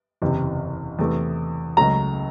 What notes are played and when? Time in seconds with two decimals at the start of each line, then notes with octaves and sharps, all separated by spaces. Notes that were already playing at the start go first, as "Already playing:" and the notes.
0.22 F#1 E2 C3
0.99 E2 C3 E3 A3
1.77 C#2 C#3 F#3 A3 A#5